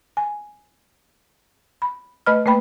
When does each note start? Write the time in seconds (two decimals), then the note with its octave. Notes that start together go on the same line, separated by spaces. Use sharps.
0.17 G#5
1.82 B5
2.26 A3 B4 D#5 B5 F6
2.46 A3 A#3 B4 G5 B5